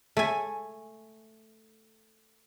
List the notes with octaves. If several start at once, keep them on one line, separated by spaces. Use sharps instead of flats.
A3 G#5